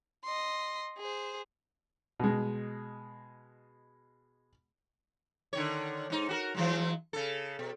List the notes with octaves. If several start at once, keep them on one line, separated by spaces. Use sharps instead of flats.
D#5 C6
G#4 C5
B2 G#3
D3 D#3 C#5
G#2 D#4
F#4 G4 A#4
E3 F#3 G#3
C#3 A4
B2